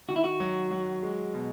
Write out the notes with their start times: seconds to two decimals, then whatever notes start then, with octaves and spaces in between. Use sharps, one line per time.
0.08 D#3 F#4
0.16 E4
0.24 F#4
0.40 F#3
0.71 F#3
1.03 G#3
1.34 B2